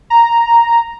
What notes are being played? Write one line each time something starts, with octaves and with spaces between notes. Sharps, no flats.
A#5